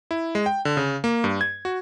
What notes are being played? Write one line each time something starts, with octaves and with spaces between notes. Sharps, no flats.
E4
G#3
G5
D3
C#3
A#3
G2
G#6
F#4